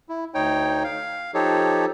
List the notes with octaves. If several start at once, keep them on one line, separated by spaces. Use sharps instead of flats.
E4
D2 D#4 C#5 G5
F5
F3 D#4 G4 A4 C#5